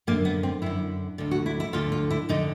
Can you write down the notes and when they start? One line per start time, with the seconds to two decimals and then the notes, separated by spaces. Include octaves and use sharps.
0.07 F#2 D3 A#3
0.25 B3
0.43 C4
0.62 F#2 D3 E4
1.18 D2 D3
1.31 F#4
1.46 E4
1.60 E4
1.73 D2 D3 F4
1.92 F4
2.10 E4
2.29 F2 D3 D#4